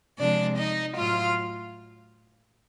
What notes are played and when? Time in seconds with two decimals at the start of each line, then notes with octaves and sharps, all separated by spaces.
0.19 C3 F3 G#3 D4 D5
0.58 D#4 D#5
0.97 A2 F#3 F4 F5